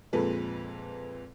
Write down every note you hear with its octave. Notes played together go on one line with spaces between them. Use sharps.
F2 A#2 G#3 A4 B4